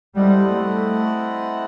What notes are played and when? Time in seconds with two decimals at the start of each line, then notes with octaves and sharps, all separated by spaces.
0.16 G3 C4 E4 A4 D#5 F#5
0.52 A3